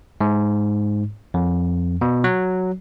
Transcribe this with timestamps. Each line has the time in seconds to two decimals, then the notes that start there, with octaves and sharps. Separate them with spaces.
0.21 G#2
1.34 F2
2.01 B2
2.24 F#3